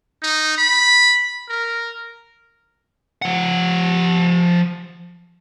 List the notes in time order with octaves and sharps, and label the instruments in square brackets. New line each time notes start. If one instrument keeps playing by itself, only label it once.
[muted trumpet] D#4
B5
A#4
[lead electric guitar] F3 F#5